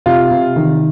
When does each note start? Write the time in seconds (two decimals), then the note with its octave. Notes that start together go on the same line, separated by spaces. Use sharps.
0.06 C3 F4
0.31 C3
0.56 D#3